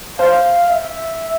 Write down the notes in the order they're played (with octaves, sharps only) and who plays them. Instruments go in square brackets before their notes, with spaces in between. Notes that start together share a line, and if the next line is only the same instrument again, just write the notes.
[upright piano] C5 [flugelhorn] F5
[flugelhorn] E5